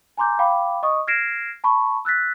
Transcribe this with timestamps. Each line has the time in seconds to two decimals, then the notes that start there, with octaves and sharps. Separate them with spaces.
0.17 G#5 A#5 C6 D6 G6
0.39 F5 G5 B5 D6
0.83 D#5 C#6 D#6
1.07 F6 G#6 A#6 C7 D7 E7
1.64 A5 B5 C#6
2.05 E6 F#6 A6 B6